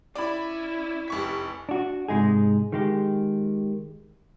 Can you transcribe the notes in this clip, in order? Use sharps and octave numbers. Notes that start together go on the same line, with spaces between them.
C#4 E4 D5 B5
F1 C#6 B6
D4 F#4
G#2 C3 G#3 D#4 G#4
D#3 G#3 G4